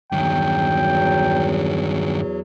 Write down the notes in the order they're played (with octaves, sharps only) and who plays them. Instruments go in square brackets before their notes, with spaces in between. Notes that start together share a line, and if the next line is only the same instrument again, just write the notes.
[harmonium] E2 F#3 [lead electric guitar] G2 D#3 [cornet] G5